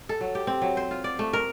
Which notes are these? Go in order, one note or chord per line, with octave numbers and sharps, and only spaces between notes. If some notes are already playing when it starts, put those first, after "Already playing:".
A4
F#3
G4
C4
F#3
C5
F4
D5
A3
A#4